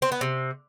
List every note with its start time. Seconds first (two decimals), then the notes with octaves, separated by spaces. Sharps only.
0.02 C4
0.12 B3
0.21 C3